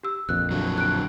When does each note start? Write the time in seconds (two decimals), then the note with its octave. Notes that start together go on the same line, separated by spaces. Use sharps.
0.03 G4 E6
0.29 A#1 F2 F#6
0.51 D3 F#3
0.78 F#6 D7